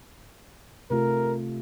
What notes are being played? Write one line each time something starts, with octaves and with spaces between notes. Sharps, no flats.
C3 A3 F4 A#4